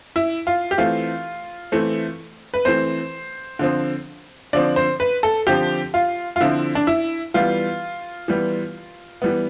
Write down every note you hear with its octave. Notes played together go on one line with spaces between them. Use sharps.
E4
F4
G4
E3 A3 C4 F4
E3 A3 C4
B4
E3 A3 C4 C5
D3 F3 C4
D3 F3 C4 D5
C5
B4
A4
D3 F3 C4 G4
F4
F4
D3 F3 C4 E4
D4
E4
E3 G3 B3 F4
E3 G3 B3
E3 G3 B3